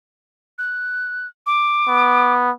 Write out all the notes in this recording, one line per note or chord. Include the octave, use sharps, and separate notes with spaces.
F#6
D6
B3